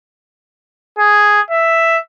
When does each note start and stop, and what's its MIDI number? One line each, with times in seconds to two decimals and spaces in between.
0.99 1.41 68
1.51 1.99 76